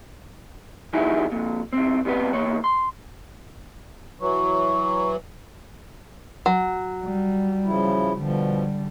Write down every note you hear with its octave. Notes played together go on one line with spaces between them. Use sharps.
E3 G3 D#4 E4 F#4 G#4
F2 A#2
B1 C4
C3 G3 B3 B4
E2 A#3 C#5
C6
E3 F#3 C#6
F#3
G3
C#3 F3 E4
B2 D3 F3 G3